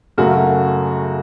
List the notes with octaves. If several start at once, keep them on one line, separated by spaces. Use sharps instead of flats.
F#2 C#3 F#3 A3 F#4